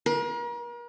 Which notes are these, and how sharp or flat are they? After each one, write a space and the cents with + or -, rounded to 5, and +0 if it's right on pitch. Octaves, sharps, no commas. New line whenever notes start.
A#4 +40